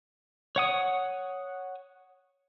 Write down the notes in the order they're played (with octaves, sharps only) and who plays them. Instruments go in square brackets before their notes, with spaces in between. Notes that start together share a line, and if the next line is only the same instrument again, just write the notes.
[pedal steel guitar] C#5 F#5 D#6